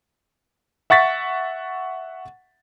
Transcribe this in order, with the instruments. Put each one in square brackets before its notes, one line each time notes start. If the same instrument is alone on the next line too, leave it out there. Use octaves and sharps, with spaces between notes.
[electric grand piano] E5 F#5 C#6 A6 B6